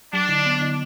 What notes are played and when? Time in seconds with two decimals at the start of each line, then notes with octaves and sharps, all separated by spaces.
0.13 F#3 D4
0.29 D3
0.46 B3
0.61 D3